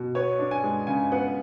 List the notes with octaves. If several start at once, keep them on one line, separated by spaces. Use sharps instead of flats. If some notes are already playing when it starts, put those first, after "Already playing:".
Already playing: B2
B3 C#5
D4
G#5
G#3
C#3 G#5
B3 F#5